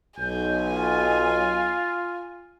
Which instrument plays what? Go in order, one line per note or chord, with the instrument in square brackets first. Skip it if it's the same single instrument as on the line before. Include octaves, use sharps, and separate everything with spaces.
[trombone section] B1 [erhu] G#5 [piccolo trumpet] G6
[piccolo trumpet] F4